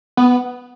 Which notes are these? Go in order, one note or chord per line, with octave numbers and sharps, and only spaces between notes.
B3